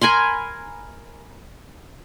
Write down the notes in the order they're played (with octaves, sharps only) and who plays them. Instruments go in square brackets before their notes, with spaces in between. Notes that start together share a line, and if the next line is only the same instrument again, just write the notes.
[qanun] A#4 G#5 B5 C6